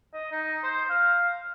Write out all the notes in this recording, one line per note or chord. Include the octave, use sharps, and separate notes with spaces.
D#5
D#4
C5
F5